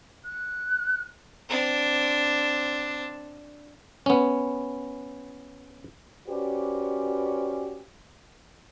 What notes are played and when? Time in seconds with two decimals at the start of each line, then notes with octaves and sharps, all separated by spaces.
0.24 F#6
1.49 C4 D4
4.06 B3 C#4
6.28 C#4 F#4 G4 B4 C5 D5